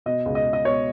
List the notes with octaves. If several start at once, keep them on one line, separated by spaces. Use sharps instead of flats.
B2 D#5
C#2
D#5
C#2
D#5
B2 C#5